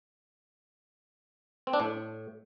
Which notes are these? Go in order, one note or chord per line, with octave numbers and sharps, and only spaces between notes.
C4
D4
A2